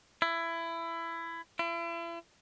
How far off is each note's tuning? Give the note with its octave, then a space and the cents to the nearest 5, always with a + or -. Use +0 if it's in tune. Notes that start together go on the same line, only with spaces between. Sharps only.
E4 +20
E4 +40